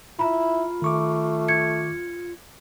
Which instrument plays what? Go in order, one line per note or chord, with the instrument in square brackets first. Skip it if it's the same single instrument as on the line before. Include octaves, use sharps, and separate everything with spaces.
[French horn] E4 [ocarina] F4 [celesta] A#5 B5
[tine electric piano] D#3 C#6 D6 [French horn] A3
[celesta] G#6 C#7